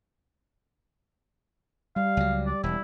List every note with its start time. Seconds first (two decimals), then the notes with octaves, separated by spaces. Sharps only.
1.96 G3 F5
2.17 C#2 F#3
2.47 D5
2.63 E1 E4